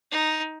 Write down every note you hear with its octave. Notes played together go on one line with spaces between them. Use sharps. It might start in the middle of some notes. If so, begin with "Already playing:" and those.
D#4